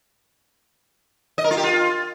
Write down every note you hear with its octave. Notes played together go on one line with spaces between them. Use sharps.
D#5
A#4
F4
G4
F4